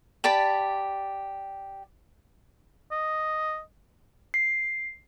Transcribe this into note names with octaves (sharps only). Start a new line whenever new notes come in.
G4 D5 A5 B5
D#5
C7